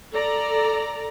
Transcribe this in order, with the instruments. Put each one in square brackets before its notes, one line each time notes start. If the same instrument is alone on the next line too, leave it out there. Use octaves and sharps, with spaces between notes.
[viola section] A4 D5 A#5